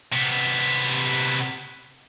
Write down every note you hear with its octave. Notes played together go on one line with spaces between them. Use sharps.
C3 B3